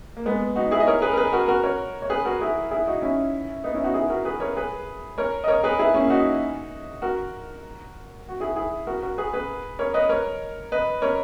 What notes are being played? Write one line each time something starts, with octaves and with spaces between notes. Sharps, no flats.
A#3
G#3 B3
D#4 F#4
E4 G#4
D#5
A#4 C#5
G#4 B4
A#4
G#4 B4
F#4 A#4
F#4 A#4
A#4 C#5
C#5
G#4 B4
F#4 A#4
E4 G#4
E4 G#4
D#4 F#4
C#4 E4
B3 D#4
C#4 E4
D#4 F#4
E4 G#4
F#4 A#4
G#4 B4
A#4 C#5
G#4 B4
A#4 C#5
D#5
A#4 C#5
G#4 B4
E4 G#4
A#3 C#4
D#4 F#4
F#4 A#4
F#4
E4 G#4
E4 G#4
F#4 A#4
F#4 A#4
G#4 B4
G#4 B4
A#4 C#5
B4 D#5
A#4 C#5
B4 D#5
A#4 C#5